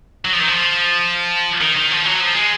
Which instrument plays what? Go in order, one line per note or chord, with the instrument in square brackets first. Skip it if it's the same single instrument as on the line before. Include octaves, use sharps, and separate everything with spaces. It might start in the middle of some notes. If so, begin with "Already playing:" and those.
[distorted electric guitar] F#3
F3
D#3
F3
D#3
D#3
F3
F#3
F3
G#3